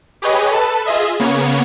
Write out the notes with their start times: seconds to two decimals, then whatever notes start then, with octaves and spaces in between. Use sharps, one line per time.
0.22 G4 G#4 B4 C#5 D#5
0.51 A4 B4 A5
0.85 F4 G#4 D#5 E5
1.19 C#3 A#3 B3 C#5